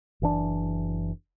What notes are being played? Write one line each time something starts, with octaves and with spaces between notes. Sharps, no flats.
F#1 E3 D4